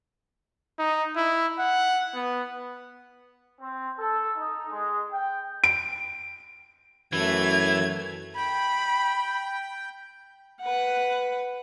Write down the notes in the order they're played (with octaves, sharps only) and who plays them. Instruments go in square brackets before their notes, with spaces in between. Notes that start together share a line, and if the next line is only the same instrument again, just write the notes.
[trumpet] D#4
E4
F#5
B3
[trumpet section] C4
A4
D#4
G#3
G5
[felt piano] D7
[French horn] F#2 [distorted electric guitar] E3 [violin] A3 G#6
[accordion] G5 [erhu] B5
[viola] B4 F#5